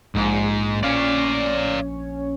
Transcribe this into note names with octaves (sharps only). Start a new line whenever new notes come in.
A#1 G#2
A#1 C#4 C#5 D5 F5